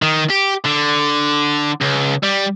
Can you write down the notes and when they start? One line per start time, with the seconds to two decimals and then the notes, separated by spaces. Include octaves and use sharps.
0.02 D#3
0.30 G4
0.65 D3
1.82 C#2
2.23 G3